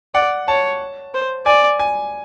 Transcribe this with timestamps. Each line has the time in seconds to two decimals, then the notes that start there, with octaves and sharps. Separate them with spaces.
0.14 D5 F#5
0.48 C#5 A5
1.14 C5
1.46 D5 G#5
1.79 G#5